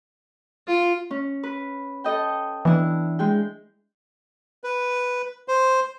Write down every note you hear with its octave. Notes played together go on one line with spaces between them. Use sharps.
F4
C#4
B4
A4 D#5 G5
E3 B3 D4 E4
G#3 G#4 G5
B4
C5